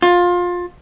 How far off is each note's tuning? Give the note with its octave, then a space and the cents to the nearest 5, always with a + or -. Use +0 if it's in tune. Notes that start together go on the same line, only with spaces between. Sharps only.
F4 +20